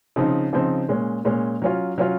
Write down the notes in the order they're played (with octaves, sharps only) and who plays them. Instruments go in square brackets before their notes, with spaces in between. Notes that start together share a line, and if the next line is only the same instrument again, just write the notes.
[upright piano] C#3 F3 C4 D#4
C#3 F3 C4 D#4
A#2 G#3 C#4
A#2 G#3 C#4
F#3 C#4 F4
F#3 C#4 F4